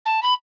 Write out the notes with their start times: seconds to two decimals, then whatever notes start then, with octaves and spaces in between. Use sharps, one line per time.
0.06 A5
0.23 B5